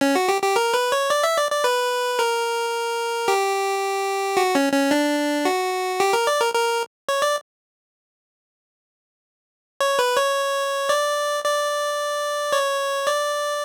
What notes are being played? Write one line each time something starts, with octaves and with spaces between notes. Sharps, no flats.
C#4
F#4
G4
G4
A#4
B4
C#5
D5
E5
D5
D5
B4
A#4
G4
F#4
C#4
C#4
D4
F#4
G4
A#4
D5
A#4
A#4
C#5
D5
C#5
B4
C#5
D5
D5
C#5
D5